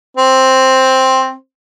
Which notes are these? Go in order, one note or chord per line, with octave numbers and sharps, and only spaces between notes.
C4 C5